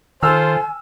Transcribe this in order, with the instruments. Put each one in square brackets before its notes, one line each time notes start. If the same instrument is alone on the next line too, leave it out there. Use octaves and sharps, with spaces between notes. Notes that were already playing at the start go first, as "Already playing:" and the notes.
[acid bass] D#3 [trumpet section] F4 A4 C5 [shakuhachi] G#5 [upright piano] E6 F6